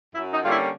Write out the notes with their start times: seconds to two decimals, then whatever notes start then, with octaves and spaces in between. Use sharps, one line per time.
0.14 F#2 E4
0.33 D#4
0.42 D3 G3 A#3 C#4 F4
0.51 E4